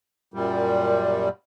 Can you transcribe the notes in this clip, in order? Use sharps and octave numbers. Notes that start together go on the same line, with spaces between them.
F#2 A#2 G3